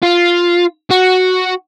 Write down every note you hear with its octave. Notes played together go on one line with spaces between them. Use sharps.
F4
F#4